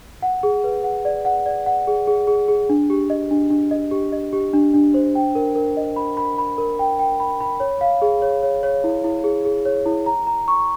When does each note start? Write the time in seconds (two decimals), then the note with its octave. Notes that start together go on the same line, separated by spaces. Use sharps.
0.22 F#5
0.43 G#4
0.64 B4
0.84 F#5
1.05 D5
1.25 F#5
1.46 D5
1.66 F#5
1.87 G#4
2.08 G#4
2.27 G#4
2.48 G#4
2.69 D4
2.90 G4
3.10 D#5
3.31 D4
3.50 D4
3.71 D#5
3.91 G4
4.12 D#5
4.33 G4
4.53 D4
4.74 D4
4.94 C5
5.15 G5
5.35 A#4
5.56 A#4
5.77 D#5
5.96 B5
6.17 B5
6.38 B5
6.58 A#4
6.79 G5
6.99 G5
7.20 B5
7.41 B5
7.60 C#5
7.81 F5
8.02 G#4
8.22 C#5
8.43 C#5
8.63 C#5
8.84 E4
9.04 E4
9.24 G#4
9.45 G#4
9.65 C#5
9.86 E4
10.06 A#5
10.27 A#5
10.48 C#6